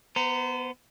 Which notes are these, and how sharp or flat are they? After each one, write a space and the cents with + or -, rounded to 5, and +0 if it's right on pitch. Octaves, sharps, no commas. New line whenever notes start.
B3 +0 C5 -40 A#5 -15